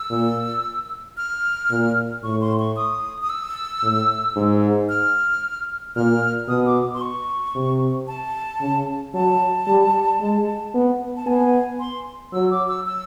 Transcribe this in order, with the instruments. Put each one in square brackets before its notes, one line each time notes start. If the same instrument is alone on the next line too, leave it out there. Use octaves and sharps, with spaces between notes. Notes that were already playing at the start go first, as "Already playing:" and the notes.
Already playing: [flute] E6
[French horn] A#2
[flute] F6
[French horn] A#2
[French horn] A2 [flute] C#6
[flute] C6
C#6
D#6
D#6
E6
[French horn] A2
G#2
[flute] F6
[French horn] A#2 [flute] F6
[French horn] B2 [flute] D#6
[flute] D6
C6
C#6
[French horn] C3
[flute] A5
[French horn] C#3
[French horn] F#3 [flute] A5
[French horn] G3
G#3
B3
[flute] A5
[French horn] B3 [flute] G#5
[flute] C6
[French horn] F#3 [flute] E6
[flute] D6
E6
E6